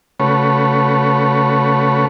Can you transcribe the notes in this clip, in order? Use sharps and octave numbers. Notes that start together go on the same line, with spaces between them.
C#3 A3 F#4 B4 C#5